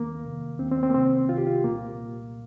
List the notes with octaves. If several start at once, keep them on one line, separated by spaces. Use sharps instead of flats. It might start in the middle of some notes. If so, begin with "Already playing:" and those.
Already playing: D#2 D#3 A#3
F2 C3 D#3
D#2 D#3 C4
C4
C4
A#3
C2 C3 D#3 C4
C2 C3 D#3 F4
G4
F4
C2 A#2 A#3
C2 A#2